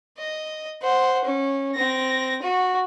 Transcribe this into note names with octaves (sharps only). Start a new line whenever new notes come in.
D#5
C5 F#5
C#4
C4 A#6
F#4